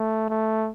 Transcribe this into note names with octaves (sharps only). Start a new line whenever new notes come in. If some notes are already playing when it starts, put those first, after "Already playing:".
Already playing: A3
A3